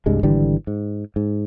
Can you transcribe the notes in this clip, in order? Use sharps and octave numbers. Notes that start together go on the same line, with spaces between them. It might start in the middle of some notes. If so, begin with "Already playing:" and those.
C2 G2 G3 G#3
G#1 D3 E3 G3
G#2
G#2